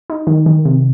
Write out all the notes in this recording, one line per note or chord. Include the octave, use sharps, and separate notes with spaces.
D#4
D#3
D#3
C3